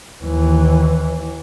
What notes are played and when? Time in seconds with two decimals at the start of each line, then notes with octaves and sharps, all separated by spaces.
0.24 D#2 E3